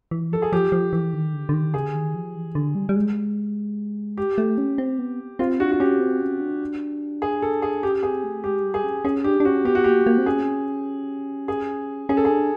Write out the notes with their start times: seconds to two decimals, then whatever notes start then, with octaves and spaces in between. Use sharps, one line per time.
0.11 E3
0.32 F3 A4
0.42 G#4
0.52 F3 G4
0.72 F3
0.93 E3
1.13 D#3
1.34 D3
1.49 D3
1.53 D#3
1.74 C#3 G#4
1.84 D3
1.95 D#3
2.15 F3
2.35 E3
2.55 D3
2.75 G3
2.89 G3
2.96 G#3
4.17 G4
4.38 A3
4.58 C#4
4.78 C4
4.99 B3
5.39 C4 F4
5.59 D4 F#4
5.72 F#4
5.80 C#4 G4
6.00 C4
6.20 C#4
6.40 D4
7.22 G#4
7.42 A4
7.62 G#4
7.83 C#4 G4
8.03 C4 G#4
8.24 A3
8.43 G#3 G4
8.63 G3
8.74 G#4
8.84 C#4
9.05 C#4 G#4
9.24 D4 G4
9.40 D4
9.45 C#4 F#4
9.65 B3 G4
9.75 F#4
9.84 A#3 G4
10.07 A#3
10.18 C4
10.26 C#4 G#4
11.48 G#4
12.09 C#4 G#4
12.17 A4
12.25 D4 G#4